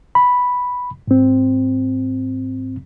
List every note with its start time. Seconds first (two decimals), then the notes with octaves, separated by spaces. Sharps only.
0.15 B5
1.07 G#2 C4